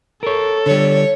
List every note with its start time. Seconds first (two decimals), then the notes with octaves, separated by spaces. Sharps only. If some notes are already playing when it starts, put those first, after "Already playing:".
0.23 A4 A#4 C#5
0.66 D3 G3 C#5